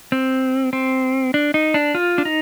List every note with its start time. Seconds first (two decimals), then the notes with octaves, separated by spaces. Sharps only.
0.12 C4
0.73 C4
1.34 D4
1.54 D#4
1.74 D4
1.95 F4
2.18 D4
2.25 D#4